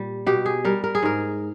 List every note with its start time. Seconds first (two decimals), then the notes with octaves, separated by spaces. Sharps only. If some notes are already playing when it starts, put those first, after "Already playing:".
Already playing: A#2 G3
0.26 B2 G4
0.46 G#4
0.65 G3 A#4
0.84 A#4
0.95 G#4
1.03 G#2 A#4